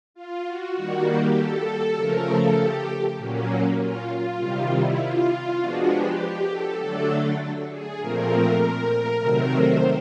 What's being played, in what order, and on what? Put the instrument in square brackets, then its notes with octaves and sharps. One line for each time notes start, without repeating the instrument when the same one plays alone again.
[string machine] F4
F#4
D#3 G3 A#3 F#4
G4
A4
C#3 F3 A3 A#4
A4
G4
A#2 F#3 A#3 C#4
F4
F4
C3 D#3 G3
E4
F4
F3 G#3 B3 D4 F#4
G4
G4
A4
D3 F#3 A3 D4 A4
G#4
A#2 F3 A3 C4 A#4
A#4
C3 D#3 F#3 A3 C4
C5